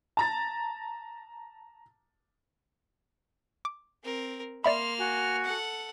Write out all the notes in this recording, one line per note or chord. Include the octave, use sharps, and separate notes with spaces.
A5 A#5 A6
D6
C4 A#4
A#3 D5 E5 B5 C6 F6
F#4 G#5
A4 F#5